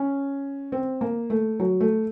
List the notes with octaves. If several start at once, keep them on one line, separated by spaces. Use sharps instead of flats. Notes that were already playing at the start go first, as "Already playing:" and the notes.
Already playing: C#4
C4
A#3
A3
F#3
A3